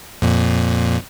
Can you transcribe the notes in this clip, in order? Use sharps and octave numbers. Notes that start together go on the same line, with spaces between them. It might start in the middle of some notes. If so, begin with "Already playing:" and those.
F2 A#2